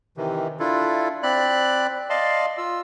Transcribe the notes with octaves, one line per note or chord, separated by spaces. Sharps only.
C3 D#3 E3
D4 E4 F4 A4
C4 D5 B5 F#6
D5 D#5 F5 A5 C6
F4 E6